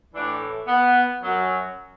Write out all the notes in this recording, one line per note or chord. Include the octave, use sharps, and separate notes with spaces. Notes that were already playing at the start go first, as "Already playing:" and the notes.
A2 E3 D4
B3
F#2 F#3